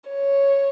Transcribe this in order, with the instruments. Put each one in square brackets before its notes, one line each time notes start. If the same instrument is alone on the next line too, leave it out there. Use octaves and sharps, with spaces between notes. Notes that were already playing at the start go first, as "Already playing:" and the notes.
[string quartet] C#5